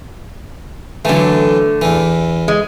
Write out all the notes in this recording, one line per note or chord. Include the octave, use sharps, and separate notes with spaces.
D3 E3 F#3 A3
E2 E3
G#3